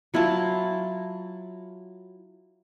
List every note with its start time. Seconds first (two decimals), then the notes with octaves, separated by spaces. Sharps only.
0.14 F#3 E4 F4 A5